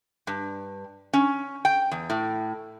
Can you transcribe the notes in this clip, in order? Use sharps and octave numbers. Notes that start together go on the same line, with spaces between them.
G2
C#4
G5
E2
A2